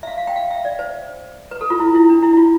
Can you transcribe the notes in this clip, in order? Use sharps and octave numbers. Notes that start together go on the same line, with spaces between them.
E5
F5
F5
G5
F5
E5
D5
C5
B4
A4
F4
E4
E4
D4
E4
E4
F4